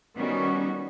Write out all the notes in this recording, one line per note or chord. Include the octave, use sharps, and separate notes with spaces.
D#3 G3 B3 C#4 F#4